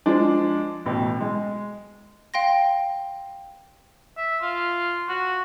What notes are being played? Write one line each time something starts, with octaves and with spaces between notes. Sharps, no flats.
F3 G#3 D4
A1 B2
G#3
F5 G5 C6 A#6
E5
F4
F#4